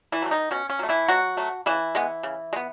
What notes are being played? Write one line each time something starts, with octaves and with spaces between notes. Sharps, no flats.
E3 E4
F#3 A3
D#3 D#4
B2 C#4
C#4
F#3 A3
E3 E4
B2 F#3 F#4
F#3 A3
C#3 E3 E4
G#3 B3
C#3
G#3
B3